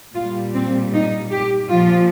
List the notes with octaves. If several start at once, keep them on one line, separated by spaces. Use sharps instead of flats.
A#2 G3 F4
C4
D#4
G4
A#2 F3 F4